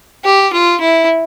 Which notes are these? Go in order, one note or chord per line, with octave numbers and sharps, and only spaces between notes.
G4
F4
E4